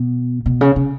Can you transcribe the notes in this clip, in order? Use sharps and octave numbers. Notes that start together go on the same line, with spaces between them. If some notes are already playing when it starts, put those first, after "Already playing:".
Already playing: B2
B2
C#3
C#3